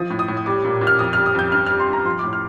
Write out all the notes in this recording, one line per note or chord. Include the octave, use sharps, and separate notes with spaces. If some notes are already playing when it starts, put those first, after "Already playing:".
Already playing: F3 D#6
A2
D#6
A2
D#6
G3 D6
A#2
A#2
F6
F2 D#6
G3 F6
D#6
F2 G6
G2 F6
G3 F6
C6
G2 A#5
F3 C6
A2 D6
F6